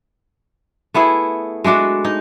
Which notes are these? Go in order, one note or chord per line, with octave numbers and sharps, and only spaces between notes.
A3 B3 E4 G#4
G#3 A3 D4 F#4
D#4